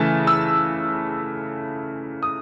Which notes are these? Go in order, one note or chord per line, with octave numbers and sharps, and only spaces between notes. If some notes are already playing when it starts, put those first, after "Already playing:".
Already playing: C#3 E3 A3 G#5 A5
E6
D#6